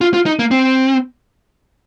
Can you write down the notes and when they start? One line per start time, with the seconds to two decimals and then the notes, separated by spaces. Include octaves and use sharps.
0.01 F4
0.14 F4
0.26 D#4
0.39 A#3
0.51 C4